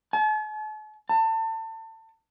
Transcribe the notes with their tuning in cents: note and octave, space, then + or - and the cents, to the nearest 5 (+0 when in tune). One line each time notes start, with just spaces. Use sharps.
A5 -45
A5 +30